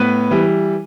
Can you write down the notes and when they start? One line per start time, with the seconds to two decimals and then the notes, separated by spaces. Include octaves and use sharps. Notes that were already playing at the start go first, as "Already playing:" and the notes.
Already playing: A2 B3 B4
0.31 E3 G3